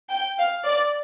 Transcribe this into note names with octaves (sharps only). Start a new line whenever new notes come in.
G5
F5
D5